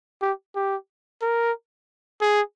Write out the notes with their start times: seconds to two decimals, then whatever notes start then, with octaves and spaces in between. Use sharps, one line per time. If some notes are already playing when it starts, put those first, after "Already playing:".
0.22 G4
0.56 G4
1.22 A#4
2.21 G#4